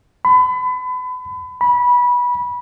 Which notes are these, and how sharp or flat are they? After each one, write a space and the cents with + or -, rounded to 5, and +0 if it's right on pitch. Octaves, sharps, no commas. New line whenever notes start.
B5 +30
B5 -20